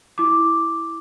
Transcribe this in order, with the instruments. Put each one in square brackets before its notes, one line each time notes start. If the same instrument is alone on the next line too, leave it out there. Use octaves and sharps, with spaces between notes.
[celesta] E4 D6